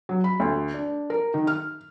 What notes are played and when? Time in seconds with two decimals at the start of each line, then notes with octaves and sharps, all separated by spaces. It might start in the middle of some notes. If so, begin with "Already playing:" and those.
0.09 F#3
0.24 B5
0.40 D2
0.74 D4
1.10 A#4
1.34 D#3
1.47 F6